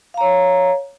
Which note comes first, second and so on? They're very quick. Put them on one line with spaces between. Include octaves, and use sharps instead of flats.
F5 A#5 C#5